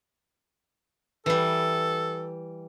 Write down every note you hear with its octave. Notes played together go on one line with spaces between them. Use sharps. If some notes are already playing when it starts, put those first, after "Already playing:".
E3 G3 A4